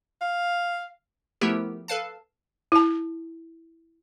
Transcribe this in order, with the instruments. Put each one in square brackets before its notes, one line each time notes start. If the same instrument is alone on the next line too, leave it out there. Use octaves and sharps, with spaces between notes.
[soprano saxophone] F5
[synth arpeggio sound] F3 A3 B3 E4 G4 A#4
A4 B4 F5 A5
[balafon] E4 A5